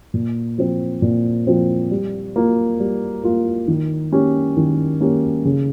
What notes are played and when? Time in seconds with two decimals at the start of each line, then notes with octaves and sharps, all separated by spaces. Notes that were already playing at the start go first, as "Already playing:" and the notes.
0.14 A#2
0.58 F3 C4
1.02 A#2
1.47 F3 C4
1.91 G3
2.36 A#3 F4
2.80 G3
3.24 A#3 F4
3.68 D#3
4.12 A#3 C#4 G4
4.57 D#3
5.01 A#3 C#4 G4
5.45 C#3